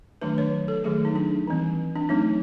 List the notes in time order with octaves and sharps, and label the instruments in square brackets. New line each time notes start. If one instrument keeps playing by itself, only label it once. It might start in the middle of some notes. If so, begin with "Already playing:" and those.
[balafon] D#3 F#3 A3 D4 B4
C#5
A4
D#3 F#3 A3 G#4
D#4
D4
E3 G3 C4
D4
F#3 A3 C4 D#4